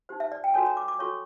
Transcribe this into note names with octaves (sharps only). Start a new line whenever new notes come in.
D#4 G4 C5
E5
D5
G5
F#4 A4 C#5 G#5
A#5
D6
D6
F#4 A4 C#5 C#6